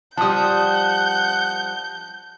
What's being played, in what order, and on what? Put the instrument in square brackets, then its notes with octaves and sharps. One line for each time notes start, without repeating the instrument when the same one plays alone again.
[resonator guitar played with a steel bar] F3 G3 [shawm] F#5 [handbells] A5 D#6 [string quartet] G6